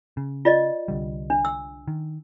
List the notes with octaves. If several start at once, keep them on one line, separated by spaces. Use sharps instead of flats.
C#3
F4 D5 D#5
C2 D3 G3
D4
E6
D#3